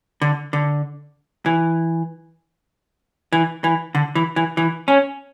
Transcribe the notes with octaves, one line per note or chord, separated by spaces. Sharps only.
D3
D3
E3
E3
E3
D3
E3
E3
E3
C#4